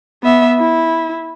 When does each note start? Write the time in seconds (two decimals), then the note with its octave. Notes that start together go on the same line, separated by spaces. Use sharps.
0.24 B3 E5
0.59 E4